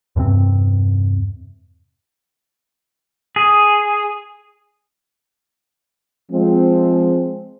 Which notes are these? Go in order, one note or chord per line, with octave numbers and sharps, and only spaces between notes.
E2 G2 C3 C4
G#4
F3 G#3 C4